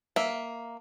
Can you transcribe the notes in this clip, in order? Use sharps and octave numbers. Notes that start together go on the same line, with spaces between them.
A#3 E5